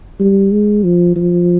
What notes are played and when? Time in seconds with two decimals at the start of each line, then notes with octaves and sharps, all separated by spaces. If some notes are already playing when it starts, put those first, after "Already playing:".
0.20 G3
0.52 G#3
0.84 F3
1.16 F3